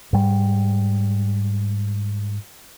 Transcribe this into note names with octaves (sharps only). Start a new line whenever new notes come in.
G#2 G3